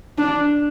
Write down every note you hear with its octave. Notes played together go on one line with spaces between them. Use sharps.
D4